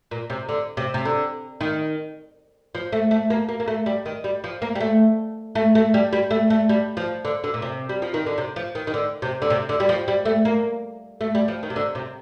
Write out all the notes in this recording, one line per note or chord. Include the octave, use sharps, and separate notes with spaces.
A#2
C3
D3
C3
C3
D3
D#3
F3
A3
A3
A#3
A#3
A#3
A3
G3
D#3
G3
F3
A#3
G3
A3
A3
A3
G3
G3
A3
A3
G3
F3
D3
D3
A#2
C3
G3
F3
D#3
D3
C3
F3
D#3
D#3
D3
C3
D3
C3
D3
G3
F3
G3
A3
A#3
A3
G3
F3
D#3
C3
D3
C3